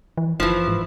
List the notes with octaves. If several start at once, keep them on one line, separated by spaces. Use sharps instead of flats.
E3
F#1 E3 F3
G#2